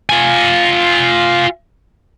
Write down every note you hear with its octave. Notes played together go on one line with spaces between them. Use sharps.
F4 G#5